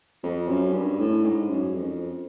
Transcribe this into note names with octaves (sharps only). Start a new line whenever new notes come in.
F2
F#2
G2
A2
G#2
F#2
F2